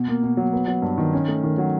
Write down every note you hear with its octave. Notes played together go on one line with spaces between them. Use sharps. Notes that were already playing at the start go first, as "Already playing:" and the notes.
Already playing: B2
A#3
B2
F#3
B3
F#3
G2
D#3
C#4
A3
D#3
F#3